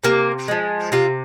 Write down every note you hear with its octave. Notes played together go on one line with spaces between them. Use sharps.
C3 A#3
F3 G#3
C3 F4